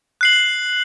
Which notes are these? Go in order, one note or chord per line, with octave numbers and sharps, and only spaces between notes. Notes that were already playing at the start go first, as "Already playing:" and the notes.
F#6 C7 F#7